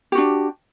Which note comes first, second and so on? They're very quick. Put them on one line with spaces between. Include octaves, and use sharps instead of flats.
G4 F#4 D4